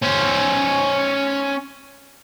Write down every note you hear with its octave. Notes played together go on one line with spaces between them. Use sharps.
C#4 C5